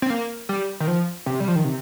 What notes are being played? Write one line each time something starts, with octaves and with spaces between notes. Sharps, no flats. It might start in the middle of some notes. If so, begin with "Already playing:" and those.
C4
A#3
G3
D#3
F3
C3
G3
F3
D#3
C3